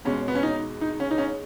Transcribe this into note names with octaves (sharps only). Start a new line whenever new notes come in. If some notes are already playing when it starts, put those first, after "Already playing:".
E2 B2 G#3 C#4
B3
C#4
D#4
D#4
C#4
D#4
C#4